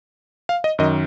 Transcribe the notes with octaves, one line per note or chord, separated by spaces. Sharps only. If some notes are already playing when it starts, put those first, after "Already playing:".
F5
D#5
F#2 D#3 D#5